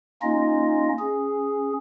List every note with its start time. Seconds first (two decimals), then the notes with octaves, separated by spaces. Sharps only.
0.22 A#3 C#4 D#4 F4 D#5
0.99 C#4 G#4